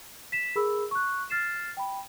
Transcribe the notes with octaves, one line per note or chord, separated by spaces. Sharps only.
B6 E7
G#4 A#4 B5 E6
C#6 F#6
F6 A6 C7 E7
G5 B5